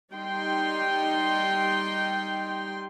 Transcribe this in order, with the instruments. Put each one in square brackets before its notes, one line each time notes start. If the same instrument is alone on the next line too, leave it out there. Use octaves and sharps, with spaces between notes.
[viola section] G3 D#4 G5 C6